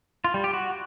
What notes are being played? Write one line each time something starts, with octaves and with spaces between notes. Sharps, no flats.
F4
G3
G4
F#4